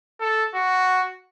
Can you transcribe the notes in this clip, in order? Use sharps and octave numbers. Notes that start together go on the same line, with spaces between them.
A4
F#4